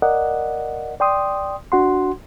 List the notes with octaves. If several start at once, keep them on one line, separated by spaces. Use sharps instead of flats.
A#4 D5 D#5 F#5
D5 G5 C6 D#6
D4 F#4 F#5 C6